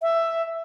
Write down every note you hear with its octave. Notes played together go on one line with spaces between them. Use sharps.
E5